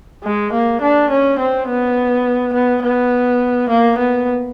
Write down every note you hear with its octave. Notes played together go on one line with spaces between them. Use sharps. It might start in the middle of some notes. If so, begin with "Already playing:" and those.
G#3
A#3
D4
C#4
C4
B3
B3
B3
A#3
B3